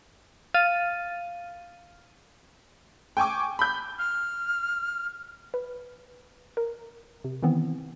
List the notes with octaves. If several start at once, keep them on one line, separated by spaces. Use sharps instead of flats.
F5 F6 A6 D#7
G5 G#5 C#6 D6
B5 G6
F6
B4
A#4
C3
D#3 E3 B3 C4